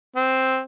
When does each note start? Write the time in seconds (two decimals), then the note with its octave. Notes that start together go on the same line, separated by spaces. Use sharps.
0.16 C4